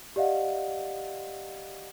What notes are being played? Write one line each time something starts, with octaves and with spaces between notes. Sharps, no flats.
G4 D5 D#5 F5 F#5